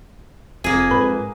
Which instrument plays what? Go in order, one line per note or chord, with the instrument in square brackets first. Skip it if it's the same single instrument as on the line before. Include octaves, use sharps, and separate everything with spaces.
[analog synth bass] F1 [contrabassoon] F2 [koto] A#3 G#4
[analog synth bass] G#2 [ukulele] B4